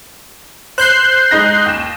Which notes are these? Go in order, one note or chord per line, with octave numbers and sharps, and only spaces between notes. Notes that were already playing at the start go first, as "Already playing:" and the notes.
C5 F#6 G6 C7
G#3 D#4 A#6
D#2 E7